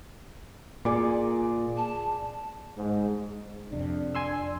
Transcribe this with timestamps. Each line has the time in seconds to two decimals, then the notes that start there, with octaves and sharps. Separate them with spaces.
0.85 A#2 G#4 D5
1.77 A5
2.78 G#2
3.72 F2 C3 D4
4.15 G#5 C6 E6